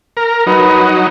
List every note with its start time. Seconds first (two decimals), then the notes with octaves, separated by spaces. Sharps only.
0.17 A#4
0.47 F#3 D#4 B4